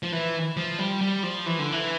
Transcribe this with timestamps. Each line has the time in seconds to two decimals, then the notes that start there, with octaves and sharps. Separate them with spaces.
0.03 F3
0.13 E3
0.57 F3
0.79 G3
1.01 G3
1.23 F3
1.46 E3
1.59 D3
1.72 E3